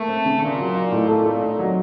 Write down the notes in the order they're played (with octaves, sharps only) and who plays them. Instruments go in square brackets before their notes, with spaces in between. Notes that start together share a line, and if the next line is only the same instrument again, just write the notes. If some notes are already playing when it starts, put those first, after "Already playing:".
Already playing: [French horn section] A3 [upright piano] A#3
[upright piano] C4
C#3
[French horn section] A#2 [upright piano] C#3
[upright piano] F#3
D#4
A2
[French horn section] A#2 [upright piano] A4
[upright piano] A3
D#4
F#3